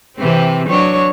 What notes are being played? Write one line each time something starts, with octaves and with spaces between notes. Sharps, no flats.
C3 E3 C4
F#3 D4 C#5